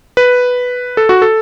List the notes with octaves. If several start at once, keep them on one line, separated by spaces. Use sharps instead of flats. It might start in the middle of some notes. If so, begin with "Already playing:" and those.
B4
A4
F#4
A4